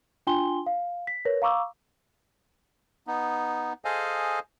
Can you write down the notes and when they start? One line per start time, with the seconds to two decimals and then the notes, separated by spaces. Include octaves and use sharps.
0.27 D4 F4 G5 G#5 C6 G7
0.66 F5
1.07 B6
1.25 A#4 B4 C#5 A#6
1.42 F5 A#5 C#6 D6 E6
3.07 B3 D#4
3.85 G#4 A4 C5 D#5 F5 G#5